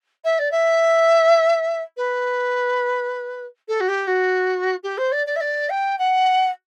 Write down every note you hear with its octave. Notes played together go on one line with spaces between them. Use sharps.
E5
D5
E5
B4
A4
F#4
G4
F#4
G4
C5
D5
D5
E5
D5
G5
F#5